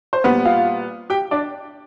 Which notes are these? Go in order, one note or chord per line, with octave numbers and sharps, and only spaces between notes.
C5
A#2 G3 B3 B4
F4 F5
G4 G5
D4 D5